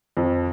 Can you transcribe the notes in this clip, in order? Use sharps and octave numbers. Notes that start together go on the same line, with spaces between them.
F2